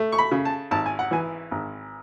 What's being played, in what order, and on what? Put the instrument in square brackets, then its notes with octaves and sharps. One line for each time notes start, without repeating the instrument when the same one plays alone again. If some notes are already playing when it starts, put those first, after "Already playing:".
Already playing: [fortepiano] A3
C#6
B5
C#3
A5
G#1 A5
G#5
F#5
E3 G#5
G#1